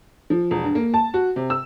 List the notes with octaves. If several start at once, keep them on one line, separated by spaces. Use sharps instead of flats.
F3
E1
G2
A#3
A5
F#4
C3
E6